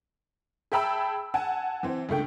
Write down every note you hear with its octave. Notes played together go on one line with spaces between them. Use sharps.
G#4 E5 G5 A5 B5 E6
F#5 G#5 A5
E3 C4
C#2 G2 A3 G5